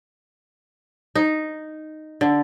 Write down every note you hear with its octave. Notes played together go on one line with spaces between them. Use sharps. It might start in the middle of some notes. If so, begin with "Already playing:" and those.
D#4
D3